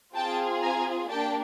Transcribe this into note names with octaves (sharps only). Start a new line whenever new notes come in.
C4 F4 G#4 G5 A5
G#5 A#5
A#3 D4 G4 G5 A5